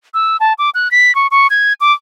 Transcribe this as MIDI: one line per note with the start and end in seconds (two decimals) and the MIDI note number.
0.14 0.37 88
0.40 0.53 81
0.59 0.70 86
0.75 0.91 90
0.91 1.14 95
1.15 1.27 85
1.31 1.47 85
1.50 1.73 92
1.81 1.93 86